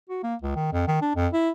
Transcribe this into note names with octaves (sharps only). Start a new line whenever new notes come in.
F#4
A#3
C#2
D#3
F2
D#3
D4
F2
E4